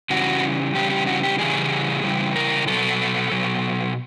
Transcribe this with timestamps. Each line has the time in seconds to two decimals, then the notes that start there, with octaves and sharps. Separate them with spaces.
0.10 C#3 E3 G3 F#4
0.75 C#3 E3 G3 G4
0.91 G4
1.07 F#4
1.23 G4
1.39 C#3 E3 G3 G#4
2.04 C#3 E3 G3
2.36 A#4
2.67 B2 F#3 A4
3.32 B2 F#3